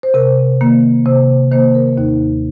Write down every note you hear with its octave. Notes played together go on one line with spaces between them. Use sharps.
C5
C3 A#4
D#3 A#3
C3 C5
D#3 A#3 C5
A#4
D#2 D#4